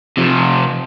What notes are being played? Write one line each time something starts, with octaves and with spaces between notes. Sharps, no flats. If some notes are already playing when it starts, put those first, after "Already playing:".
C3 F3